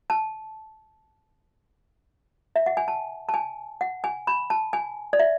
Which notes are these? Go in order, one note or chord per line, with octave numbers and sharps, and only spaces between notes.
A5
E5
F#5
G#5
A5
A5
G#5
F#5
G#5
B5
A5
G#5
D5
E5